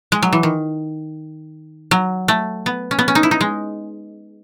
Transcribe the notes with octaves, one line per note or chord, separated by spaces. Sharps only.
G#3
F#3
E3
D#3
F#3
A3
B3
C#4
B3
C#4
D#4
E4
D#4
G#3